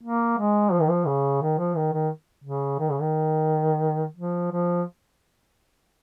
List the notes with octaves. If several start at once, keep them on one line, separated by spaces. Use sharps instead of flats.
A#3
G#3
F3
D#3
F3
C#3
D#3
F3
D#3
D#3
C#3
D#3
C#3
D#3
F3
F3